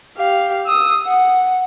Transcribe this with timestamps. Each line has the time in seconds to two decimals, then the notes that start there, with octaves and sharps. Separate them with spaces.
0.18 G4 F5
0.66 D#6 E6
1.08 F#5